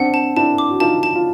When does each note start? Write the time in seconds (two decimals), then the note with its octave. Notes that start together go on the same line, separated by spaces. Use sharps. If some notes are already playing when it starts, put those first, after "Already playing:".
Already playing: C4 D4 F#5
0.14 A5
0.36 D4 E4 A5
0.58 D6
0.70 F#4
0.80 D#4 F4 A5
1.03 A5
1.15 F4